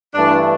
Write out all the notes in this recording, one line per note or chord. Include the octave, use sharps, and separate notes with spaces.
G2 E3 A3 D4